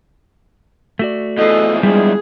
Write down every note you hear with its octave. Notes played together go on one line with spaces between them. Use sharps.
A3 F#4 D5
E2 F3 A4 D#5
G3 G#3 D4 G#4